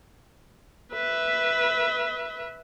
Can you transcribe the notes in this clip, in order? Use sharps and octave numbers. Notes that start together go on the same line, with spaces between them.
B4 E5